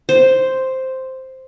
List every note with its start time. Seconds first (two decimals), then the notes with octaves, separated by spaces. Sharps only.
0.09 C5